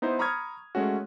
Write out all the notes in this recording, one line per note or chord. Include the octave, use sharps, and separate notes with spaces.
B3 D#4 E4 C5
A#5 B5 C#6 D#6 F6 G#6
G#3 A3 C#4 F#4